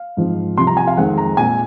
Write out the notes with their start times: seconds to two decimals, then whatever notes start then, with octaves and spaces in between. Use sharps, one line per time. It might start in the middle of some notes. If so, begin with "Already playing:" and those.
Already playing: F5
0.17 G#2 F3 C4
0.57 C2 C3 F3 C6
0.67 A#5
0.77 G#5
0.87 F5
0.97 F2 D#3 G#3 C4 F#5
1.18 A#5
1.37 A#2 G#3 C4 G#5